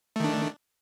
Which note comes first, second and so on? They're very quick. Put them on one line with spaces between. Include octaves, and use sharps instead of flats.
A3 D#3 D4